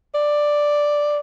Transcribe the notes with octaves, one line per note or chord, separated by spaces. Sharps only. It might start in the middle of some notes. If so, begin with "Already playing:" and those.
D5